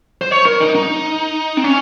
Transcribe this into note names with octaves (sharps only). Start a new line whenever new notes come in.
C5
C#5
A#4
D#4
D#4
C4
C#4